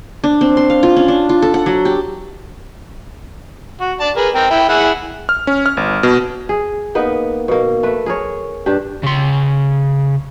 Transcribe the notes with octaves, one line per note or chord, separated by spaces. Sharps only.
D4
C4
C6
F5
F4
C#4
D4
F4
A4
F#5
F#3
G4
F#4
D5 A5
G#4 A#4 B4
C4 A#4 G5
E4 G5
E4 G#4 F#5
F6
C#4
F6
G1
B2
G#4
A#3 B3 D#4 B4
B2 A#3
A3 B4
G#4 A#4 C#5
G2 D4 G4
C#3 C6